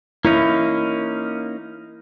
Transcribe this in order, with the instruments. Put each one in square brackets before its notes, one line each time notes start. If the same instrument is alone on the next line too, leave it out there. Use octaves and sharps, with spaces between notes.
[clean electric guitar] A#3 C#4 D#4 [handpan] E4